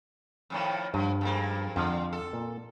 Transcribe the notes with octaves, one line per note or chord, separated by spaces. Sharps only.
F2 A2 D#3
G2 F3
F2 G#2 A#3
F2 D3
A4
A#2